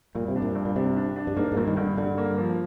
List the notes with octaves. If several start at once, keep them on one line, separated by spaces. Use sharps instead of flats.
G2 A#2
C3
D4
A#2
G2
A#2
C3 D4
D4
D4
G2
G#2 A#3
G#2
G2 A#2
D#3
G2 D3
G2 D3
A#3
F3